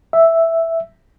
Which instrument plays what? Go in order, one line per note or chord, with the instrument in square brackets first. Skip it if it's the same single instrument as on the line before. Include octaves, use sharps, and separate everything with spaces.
[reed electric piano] E5